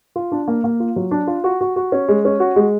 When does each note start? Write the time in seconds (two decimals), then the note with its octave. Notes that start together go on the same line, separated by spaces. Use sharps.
0.16 F4
0.32 D4
0.48 A#3
0.64 A#3
0.80 F4
0.96 F#3
1.11 D4
1.27 F4
1.44 F#4
1.61 F#4
1.76 F#4
1.92 C#4
2.08 G#3
2.25 C#4
2.40 F#4
2.56 G#3